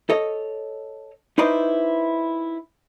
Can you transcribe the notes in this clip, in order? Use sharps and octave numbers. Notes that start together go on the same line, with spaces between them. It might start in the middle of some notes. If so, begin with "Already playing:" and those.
A4 C#5 D#5
D#4 E4 B4 C5 D5 D#5